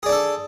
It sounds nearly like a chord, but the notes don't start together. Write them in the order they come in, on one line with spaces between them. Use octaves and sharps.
G#4 D5 D4 A4